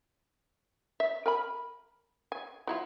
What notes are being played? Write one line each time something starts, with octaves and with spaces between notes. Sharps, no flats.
E5
A#4 G#5 B5
G#5
F#3 E4 F4